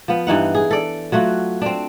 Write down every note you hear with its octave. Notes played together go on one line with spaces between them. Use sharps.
F3 B3
G2 E3 D#4 F#5
G#4
A4 D5
F#3 A3 F4 F#4
C4 D4